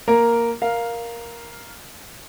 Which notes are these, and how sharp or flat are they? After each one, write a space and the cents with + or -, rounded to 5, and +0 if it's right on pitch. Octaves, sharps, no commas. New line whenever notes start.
A#3 +0 A#4 +0
A#4 +5 F5 +0